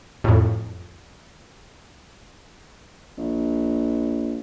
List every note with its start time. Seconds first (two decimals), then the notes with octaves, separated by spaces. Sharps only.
0.24 F2 A2
3.18 A#1